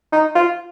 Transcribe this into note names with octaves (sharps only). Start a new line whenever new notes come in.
D#4
F4